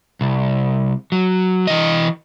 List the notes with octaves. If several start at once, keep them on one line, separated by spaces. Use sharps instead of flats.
C2
F#3
E3 D#5